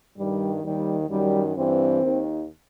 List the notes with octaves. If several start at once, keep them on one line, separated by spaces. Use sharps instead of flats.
G2 D#3 G3
D#2 D#3 G3
F#2 D#3 G3
G2 E3 C4
D#2 D#3